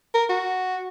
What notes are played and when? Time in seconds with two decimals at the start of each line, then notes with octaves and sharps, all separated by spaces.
0.14 A#4
0.29 F#4